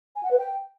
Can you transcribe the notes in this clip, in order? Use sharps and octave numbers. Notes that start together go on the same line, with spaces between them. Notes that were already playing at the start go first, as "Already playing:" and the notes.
G#5
F#5
B4
G5